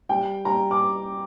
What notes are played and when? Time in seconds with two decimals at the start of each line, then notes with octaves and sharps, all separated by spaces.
0.09 G3 G5
0.45 G3 A#5
0.71 D6